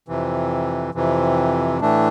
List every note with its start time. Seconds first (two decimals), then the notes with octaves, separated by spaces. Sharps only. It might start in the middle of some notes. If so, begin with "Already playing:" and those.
0.08 F2 C3 E3
0.94 F2 C3 E3
1.81 A2 E3 A3 D4